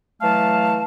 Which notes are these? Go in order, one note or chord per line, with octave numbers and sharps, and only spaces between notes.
E3 F#3 A3 F5 A5